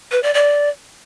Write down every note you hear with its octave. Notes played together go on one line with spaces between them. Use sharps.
B4
D5
D5